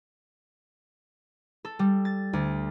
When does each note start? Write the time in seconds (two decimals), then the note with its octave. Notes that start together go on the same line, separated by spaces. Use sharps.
1.65 A4
1.79 G3
2.05 A6
2.33 D2